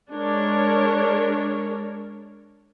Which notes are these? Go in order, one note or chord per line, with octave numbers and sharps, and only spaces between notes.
G#3 D4 A#4 C#5